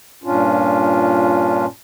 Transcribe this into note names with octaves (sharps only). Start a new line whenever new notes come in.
G2 A#2 C#4 D4 F4